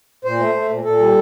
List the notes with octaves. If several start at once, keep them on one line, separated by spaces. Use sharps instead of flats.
A#2 C5
A3
A3
A#2
A#2 A4
G3